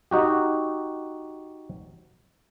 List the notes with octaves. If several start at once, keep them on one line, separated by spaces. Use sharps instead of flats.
D#4 F#4 G4